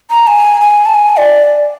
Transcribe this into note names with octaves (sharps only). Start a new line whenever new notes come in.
A#5
G#5
G#5
A5
G#5
D5